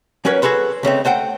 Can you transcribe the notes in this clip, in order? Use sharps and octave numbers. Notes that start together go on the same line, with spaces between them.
F#3 C#4 A#4 B4 C#5
F#4 G#4 A4 B4 C5
C#2 C#3 A3 C4
A3 C5 F#5 G5